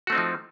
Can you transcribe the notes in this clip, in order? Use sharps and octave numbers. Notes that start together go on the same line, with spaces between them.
F3 A3 C4 D#4 F#4